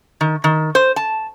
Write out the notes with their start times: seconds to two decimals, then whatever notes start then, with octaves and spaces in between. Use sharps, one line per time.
0.21 D#3
0.44 D#3
0.75 C5
0.96 A5